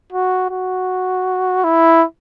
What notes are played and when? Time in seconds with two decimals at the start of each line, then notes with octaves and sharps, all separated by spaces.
0.13 F#4
0.51 F#4
1.64 E4